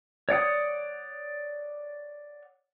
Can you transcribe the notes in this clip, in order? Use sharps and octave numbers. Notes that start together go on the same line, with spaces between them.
C#5 D5 F#5 D#6